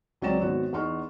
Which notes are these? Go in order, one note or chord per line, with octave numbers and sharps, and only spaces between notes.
C#2 F#3 C4 D5 A6 E7
G#1 B3 F#4 C#5
E2 B3 D#4 C6 C#6 F6